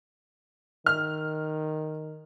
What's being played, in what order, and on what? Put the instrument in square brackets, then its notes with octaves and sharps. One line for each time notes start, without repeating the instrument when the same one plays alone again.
[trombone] D#3 [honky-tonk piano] F6